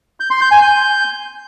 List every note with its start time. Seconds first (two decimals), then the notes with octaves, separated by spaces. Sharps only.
0.20 G6
0.30 C6
0.41 G6
0.51 G#5
0.62 G6